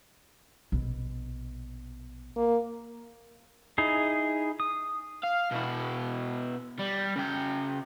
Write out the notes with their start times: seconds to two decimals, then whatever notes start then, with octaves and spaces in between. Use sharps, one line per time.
0.72 A#1 B2
2.37 A#3
3.78 D#4 E4 G#4
4.60 D#6
5.24 F5
5.52 B2 E4
6.79 G3
7.16 C#3 G5